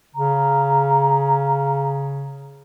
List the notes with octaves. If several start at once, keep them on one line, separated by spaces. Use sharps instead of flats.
C#3 A#5